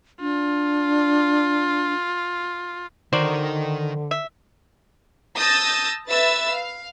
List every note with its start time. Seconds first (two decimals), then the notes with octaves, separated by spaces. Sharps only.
0.20 D4 F4
3.13 D3 D#3 F#4 A#4 C5 D5
4.11 E5
5.37 A5 D#6 E6 G6 A6 A#6
6.09 B4 E5 E6 A6
6.51 F5